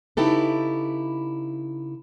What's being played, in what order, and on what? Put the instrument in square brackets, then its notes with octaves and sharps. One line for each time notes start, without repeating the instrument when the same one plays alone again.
[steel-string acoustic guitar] C#3 D#4 E4 G4 A4 B4